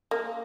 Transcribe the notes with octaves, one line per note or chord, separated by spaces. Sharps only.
A#3